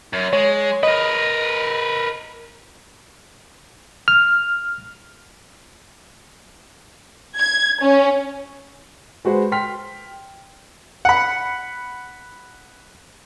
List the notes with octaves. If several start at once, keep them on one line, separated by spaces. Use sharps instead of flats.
F#2
G#3 C#5
A#4 B4 D#5
F6
G#6
C#4
G#3 F#4 B4 C5
G5 C6 F6 B6
F#5 B5